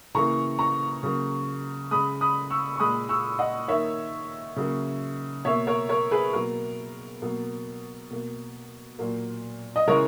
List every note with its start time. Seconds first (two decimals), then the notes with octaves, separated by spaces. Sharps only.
0.15 C#3 E3 A#3 A#5 C#6
0.59 A#5 C#6
1.03 C#3 F#3 A#3
1.91 C#3 G#3 B5 D#6
2.21 B5 D#6
2.50 C#6 E6
2.76 C#6
2.80 A#2 G#3 B5 D#6
3.09 C#6 E6
3.39 D#5 F#5
3.68 D#3 A#3 C#5 E5
4.56 C#3 F#3 A#3
5.45 B2 A#3 C#5 E5
5.67 A#4 C#5
5.89 A#4 C#5
6.11 G#4 B4
6.33 B2 F#3 A#3 A#4
7.22 B2 F#3 A#3
8.10 B2 A#3
8.99 A#2 F#3 A#3
9.76 D#5
9.87 C#3 E3 G#3 A#4 C#5